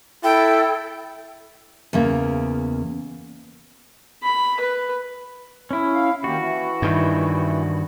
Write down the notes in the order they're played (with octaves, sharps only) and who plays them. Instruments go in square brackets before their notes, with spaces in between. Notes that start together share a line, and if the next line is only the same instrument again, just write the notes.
[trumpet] E4 [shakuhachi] A4 [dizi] G5
[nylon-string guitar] E2 C#3 A#3
[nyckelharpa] B5
B4
[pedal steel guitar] C#4 E4
[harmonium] F5
[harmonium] D#3 A#3 G4 [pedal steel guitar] F#4
[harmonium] E3 E4
[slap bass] G2 D#3